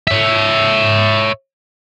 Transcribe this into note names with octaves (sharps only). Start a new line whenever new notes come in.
C#5 E5